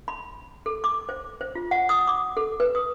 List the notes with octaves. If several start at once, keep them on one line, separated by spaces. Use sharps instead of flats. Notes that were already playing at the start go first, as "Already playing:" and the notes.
B5
A4
D6
C5
C5
F4
F#5
D#6
D6
A4
B4
D#6